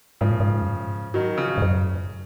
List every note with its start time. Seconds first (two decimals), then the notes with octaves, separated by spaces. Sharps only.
0.21 G#2 C#3 F3
0.31 A#2
0.40 G#2
0.62 F#2
0.68 G#2
1.14 D#3 F#3
1.37 C#3 F3
1.58 G#2
1.62 F#2